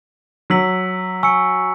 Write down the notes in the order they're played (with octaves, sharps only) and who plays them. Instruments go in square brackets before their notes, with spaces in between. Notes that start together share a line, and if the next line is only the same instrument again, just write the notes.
[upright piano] F#3 [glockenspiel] E6 B6 F#7
[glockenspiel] G#5 C#6 E6 C#7